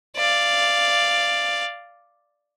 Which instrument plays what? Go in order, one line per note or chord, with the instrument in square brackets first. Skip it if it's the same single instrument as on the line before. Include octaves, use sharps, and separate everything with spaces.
[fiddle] D5 F5